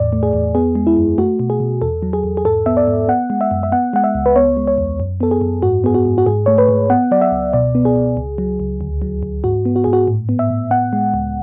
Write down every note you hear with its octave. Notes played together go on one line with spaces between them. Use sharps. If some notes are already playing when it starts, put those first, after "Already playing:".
Already playing: E2 A2 D5
A3
G#4
E2
B3 G#4
G#3
E4
F#2
A3 F#4
B2
G#4
B2
E2 A4
F#3
G#4
E2
G#4
G#2 A4
B3 E5
D5
G#2
B3 F#5
G#3
E5
F#2
E5
B3 F#5
G#3 F#5
E5
C#2
B4
B3 C#5
G#3
C#5
E2
F#2
B3 A4
G#4
F#2
G#2 F#4
B3 G#4
F#4
G#2
F#4
G#2 G#4
A3 C#5
B4
G#2
B3 F#5
F#3 D5
E5
C#2
B2 D5
B3
G#4
B2
C#2
F#3
C#2
D2
F#3
D2
G#2 F#4
B3
F#4
G#2 G#4
F#4
A2
B3
E5
A2
B3 F#5
G#3
C#2